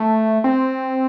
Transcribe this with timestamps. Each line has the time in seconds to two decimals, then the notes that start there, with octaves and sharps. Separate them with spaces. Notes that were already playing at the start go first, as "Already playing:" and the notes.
Already playing: A3
0.44 C4